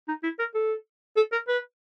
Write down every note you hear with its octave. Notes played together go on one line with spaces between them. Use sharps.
D#4
E4
A#4
A4
A4
A#4
B4